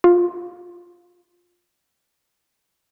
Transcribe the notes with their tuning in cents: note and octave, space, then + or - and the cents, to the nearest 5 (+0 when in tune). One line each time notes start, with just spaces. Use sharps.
F4 +15